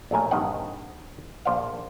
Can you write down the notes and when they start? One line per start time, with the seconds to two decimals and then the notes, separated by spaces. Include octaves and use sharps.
0.11 A#1 F#3 A3 A#4 G#5
0.31 A#1 G2 D#3 C4 D#5 F#5
1.45 A#1 C5 D5 F5